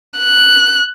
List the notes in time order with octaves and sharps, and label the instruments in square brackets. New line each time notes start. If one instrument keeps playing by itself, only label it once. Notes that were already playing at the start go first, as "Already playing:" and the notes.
[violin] F#6